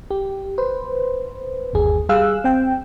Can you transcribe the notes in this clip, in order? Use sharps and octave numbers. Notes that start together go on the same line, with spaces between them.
G4
B4 C5
G1 D#2 G#4
G3 G#4 F5 E6 F#6
C4 G5